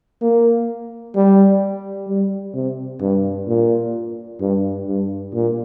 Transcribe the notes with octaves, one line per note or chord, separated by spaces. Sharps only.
A#3
G3
G3
C3
G2
A#2
G2
G2
A#2